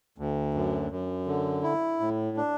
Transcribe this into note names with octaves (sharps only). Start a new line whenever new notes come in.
D2
F#2
F#2
D3
E4
A2
D4